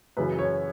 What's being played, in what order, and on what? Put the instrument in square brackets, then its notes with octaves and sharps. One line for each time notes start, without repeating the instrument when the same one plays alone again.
[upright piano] F#2 C#3 E3 B4
C#5